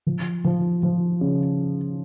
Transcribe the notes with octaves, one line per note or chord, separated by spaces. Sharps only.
F3
F3
F3
C#3